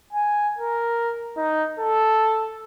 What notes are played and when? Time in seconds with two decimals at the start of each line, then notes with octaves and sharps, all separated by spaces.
0.13 G#5
0.59 A#4
1.37 D#4
1.80 A4